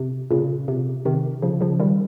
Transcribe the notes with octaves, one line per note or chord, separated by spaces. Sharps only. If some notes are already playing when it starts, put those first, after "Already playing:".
Already playing: C3
A#2 C#3
C3
C3 D#3
C#3 F3
C#3 F3
D#3 G3